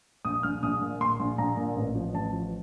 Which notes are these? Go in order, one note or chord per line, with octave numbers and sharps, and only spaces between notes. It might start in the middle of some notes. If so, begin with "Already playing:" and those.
A#1 D#6
A#1 F6
A#1 D#6
A#2
A#2 C6
A#1
A#1 A#5
A#2
A1
F3
A1 A5
F3